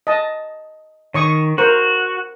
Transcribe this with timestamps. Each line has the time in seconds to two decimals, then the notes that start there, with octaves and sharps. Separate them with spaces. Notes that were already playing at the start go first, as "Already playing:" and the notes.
0.07 D#5 A5
1.14 D#3 C#5 C#6 D#6
1.58 F#4 A#4 C5